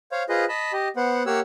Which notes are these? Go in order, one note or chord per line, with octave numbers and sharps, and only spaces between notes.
C5 C#5 F5
F4 G#4 B4 C5 D#5
D#5 A5 B5
G4 D#5
B3 C5 F#5
A#3 G4 C#5 F#5 E6